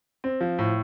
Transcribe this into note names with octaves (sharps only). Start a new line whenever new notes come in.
C4
F3
A2